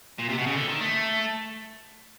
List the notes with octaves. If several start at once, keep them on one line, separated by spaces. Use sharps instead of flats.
A#2
C3
B2
C#3
D3
D#3
A3